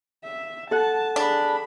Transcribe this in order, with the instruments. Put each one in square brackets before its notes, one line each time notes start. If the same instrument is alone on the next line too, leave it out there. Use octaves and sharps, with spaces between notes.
[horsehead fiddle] E5
[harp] A4 F#5 [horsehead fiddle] A5
[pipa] D4 [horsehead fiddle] G#4 B5